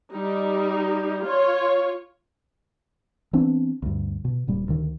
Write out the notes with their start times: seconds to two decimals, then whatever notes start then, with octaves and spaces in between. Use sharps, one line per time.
0.11 G3 D#4
1.23 F4 C#5
3.33 E3 B3 C4 D4
3.82 D2 G2
4.25 B2
4.47 D1 A#2 G3
4.68 D2 D#3